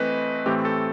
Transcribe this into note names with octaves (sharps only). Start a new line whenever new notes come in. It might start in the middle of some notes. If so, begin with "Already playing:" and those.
Already playing: E3 A3 C4 B4 D#5
A2 E3 A3 C4 G4
A4